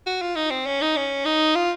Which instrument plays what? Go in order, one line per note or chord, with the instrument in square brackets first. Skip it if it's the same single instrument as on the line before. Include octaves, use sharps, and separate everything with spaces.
[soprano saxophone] F#4
F4
D#4
C4
C#4
D#4
C#4
D#4
F4